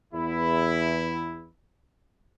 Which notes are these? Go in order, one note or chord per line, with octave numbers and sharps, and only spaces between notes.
E2 E4